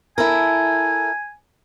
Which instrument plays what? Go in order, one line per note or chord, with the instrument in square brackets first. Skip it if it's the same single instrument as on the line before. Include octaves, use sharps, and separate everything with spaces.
[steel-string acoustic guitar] E4 A4 A#4 [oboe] G#5